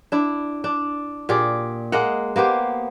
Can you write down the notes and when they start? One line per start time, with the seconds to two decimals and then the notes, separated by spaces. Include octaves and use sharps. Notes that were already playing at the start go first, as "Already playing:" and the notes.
0.12 D4 E4
0.64 D4
1.29 A#2 G4 G#4 D5
1.92 G#3 A#3 D#5 F#5
2.36 A#3 B3 G4 C5